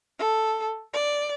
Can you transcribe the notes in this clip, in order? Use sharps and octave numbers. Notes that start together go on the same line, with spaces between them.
A4
D5